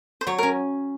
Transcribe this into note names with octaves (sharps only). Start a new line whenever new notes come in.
C5
F#3 C#5
C#4 A#4